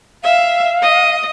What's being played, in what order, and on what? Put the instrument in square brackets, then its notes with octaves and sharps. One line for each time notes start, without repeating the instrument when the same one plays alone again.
[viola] E5 [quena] F5
[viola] D#5